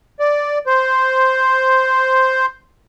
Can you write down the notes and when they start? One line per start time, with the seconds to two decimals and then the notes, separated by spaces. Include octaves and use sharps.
0.20 D5
0.67 C5